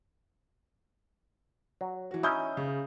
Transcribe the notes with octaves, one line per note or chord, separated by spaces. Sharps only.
F#3
E3 F#4
C#4 D#4 E4 D#6 G6
C#3